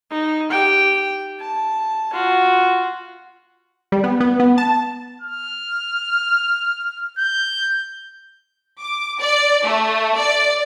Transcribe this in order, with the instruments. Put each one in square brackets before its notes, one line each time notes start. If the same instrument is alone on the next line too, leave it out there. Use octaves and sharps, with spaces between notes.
[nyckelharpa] D#4
G4 G5
A5
F4 F#4
[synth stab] G3
B3
B3
B3
A5
[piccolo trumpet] F6
G6
[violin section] D6
D5
A3
D5